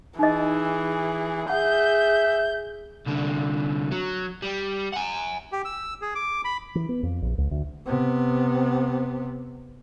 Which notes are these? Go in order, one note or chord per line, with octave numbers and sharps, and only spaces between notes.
E3 D#4 G#4 D#5
G#4 E5 F#5 G6
C2 D3
F#3
G3
F#5 G#5
G4
E6
G#4
D6
B5
E3
B3
F2
A#1
C#2
D2
C3 B3